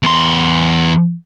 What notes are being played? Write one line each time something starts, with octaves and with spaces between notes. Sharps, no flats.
E2 C6